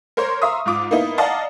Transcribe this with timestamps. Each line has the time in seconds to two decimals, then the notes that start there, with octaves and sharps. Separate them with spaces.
0.17 A#4 C5 C#5 A#5 C6
0.42 E5 F5 A#5 C6 C#6 D#6
0.66 G#2 F4 D6 D#6
0.91 A#3 B3 D#4 E4
1.18 D5 D#5 F5 F#5 A5 A#5